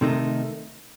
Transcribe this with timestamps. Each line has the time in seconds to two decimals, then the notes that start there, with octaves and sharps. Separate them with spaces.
0.01 C3 D#3 A3 D#4